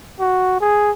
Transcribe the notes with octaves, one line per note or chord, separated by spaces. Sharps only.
F#4
G#4